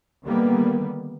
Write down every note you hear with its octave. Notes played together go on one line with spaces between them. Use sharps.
D3 D#3 G3 A#3 B3